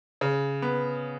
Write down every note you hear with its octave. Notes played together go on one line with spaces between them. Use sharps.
C#3
B3